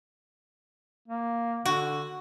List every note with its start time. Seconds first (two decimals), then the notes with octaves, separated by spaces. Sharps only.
1.08 A#3
1.65 D3 F#4